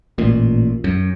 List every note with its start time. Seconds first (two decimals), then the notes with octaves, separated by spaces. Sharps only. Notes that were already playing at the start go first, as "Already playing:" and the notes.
0.18 A1 A#2
0.84 F#2